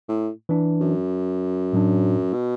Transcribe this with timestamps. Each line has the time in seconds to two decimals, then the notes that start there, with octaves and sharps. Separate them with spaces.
0.09 A2
0.49 E3 D4
0.81 F#2
1.73 A2 F#3 D4
2.34 B2